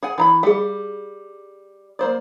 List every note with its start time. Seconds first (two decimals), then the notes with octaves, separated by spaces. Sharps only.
0.03 G#4 F#5 G#5
0.18 E3 A#5 B5
0.43 G3 G#4 F5
1.99 A#3 C5 D5